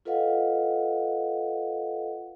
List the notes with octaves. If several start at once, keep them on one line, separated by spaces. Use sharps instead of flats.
F4 A4 B4 D#5 F5 F#5